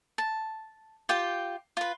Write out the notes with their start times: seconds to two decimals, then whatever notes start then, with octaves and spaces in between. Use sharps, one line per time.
0.18 A5
1.09 F4 G4 G5
1.77 F4 B4